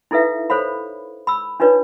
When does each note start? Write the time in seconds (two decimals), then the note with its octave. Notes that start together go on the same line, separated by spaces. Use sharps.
0.11 D#4 E4 A4 B4 E5 F5
0.50 A4 C5 C#5 F5 B5
1.27 B5 E6
1.60 D4 D#4 F4 B4 C#5 D5